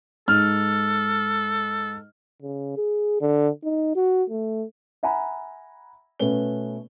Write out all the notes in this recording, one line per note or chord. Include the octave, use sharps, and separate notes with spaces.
G#2 A4 F6
C#3
G#4
D3
D#4
F#4
A3
E5 F#5 G#5 A#5 B5
B2 A3 B3 C#4 B4 G7